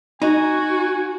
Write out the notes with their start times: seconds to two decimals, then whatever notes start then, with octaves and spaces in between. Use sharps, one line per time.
0.22 D#4 F#4 G#5